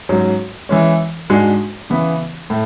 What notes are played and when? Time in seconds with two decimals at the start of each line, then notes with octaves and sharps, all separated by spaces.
0.09 G#2 F#3 C#4
0.69 E3 G#3 C#4
1.30 G#2 G#3 D4 F#4
1.90 C#3 E3 B3
2.50 A2